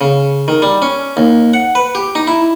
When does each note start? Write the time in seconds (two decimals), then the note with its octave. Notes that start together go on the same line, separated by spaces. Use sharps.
0.01 C#3
0.48 D#3
0.62 G3
0.82 C#4
1.17 D#2
1.54 F#5
1.75 B4
1.95 G4
2.15 D#4
2.27 E4